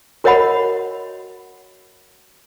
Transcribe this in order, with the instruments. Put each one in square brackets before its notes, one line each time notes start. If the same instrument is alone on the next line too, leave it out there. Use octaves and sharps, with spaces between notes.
[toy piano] F#4 A#4 C#5 D#5 F#5 B5